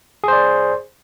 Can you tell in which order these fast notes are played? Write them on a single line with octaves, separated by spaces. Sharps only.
G#4 C5 D5